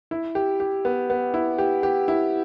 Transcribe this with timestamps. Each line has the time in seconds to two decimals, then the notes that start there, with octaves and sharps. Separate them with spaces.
0.11 E4
0.35 G4
0.60 G4
0.85 B3
1.10 B3
1.34 E4
1.58 G4
1.83 G4
2.08 E4